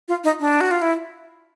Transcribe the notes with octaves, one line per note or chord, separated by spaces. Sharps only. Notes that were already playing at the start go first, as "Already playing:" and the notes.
F4
D#4
D4
F#4
F4
E4